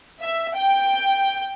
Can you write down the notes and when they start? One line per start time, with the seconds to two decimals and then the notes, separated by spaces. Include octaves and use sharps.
0.20 E5
0.55 G5